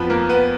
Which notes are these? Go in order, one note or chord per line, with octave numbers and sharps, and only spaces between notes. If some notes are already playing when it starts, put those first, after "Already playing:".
Already playing: F2 F3 B3 B4
A#3 A#4
B3 B4